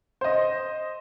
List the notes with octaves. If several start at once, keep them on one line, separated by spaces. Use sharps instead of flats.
C5 D#5